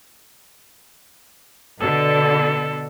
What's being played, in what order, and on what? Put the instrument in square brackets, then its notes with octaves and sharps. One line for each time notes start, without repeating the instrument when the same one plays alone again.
[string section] B2 D3 [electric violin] A4